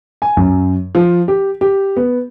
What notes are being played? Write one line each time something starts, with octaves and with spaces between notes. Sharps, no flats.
G#5
F#2
F3
G4
G4
B3